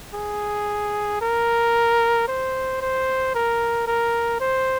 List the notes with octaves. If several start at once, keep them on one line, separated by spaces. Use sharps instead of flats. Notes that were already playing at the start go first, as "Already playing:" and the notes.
G#4
A#4
C5
C5
A#4
A#4
C5